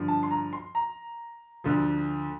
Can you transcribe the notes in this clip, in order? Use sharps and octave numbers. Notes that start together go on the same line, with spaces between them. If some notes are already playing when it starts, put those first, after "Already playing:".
Already playing: G2 D3 F3
A5
C6
A#5
C6
A#5
D2 D3 F3